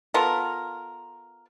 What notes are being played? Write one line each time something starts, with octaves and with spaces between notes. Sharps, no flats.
B3 F4 A4 A#4